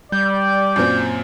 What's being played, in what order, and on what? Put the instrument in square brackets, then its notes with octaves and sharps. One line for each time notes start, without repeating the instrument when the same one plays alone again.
[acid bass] G3 [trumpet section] D5 [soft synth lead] G6
[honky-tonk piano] F#2 A#2 C4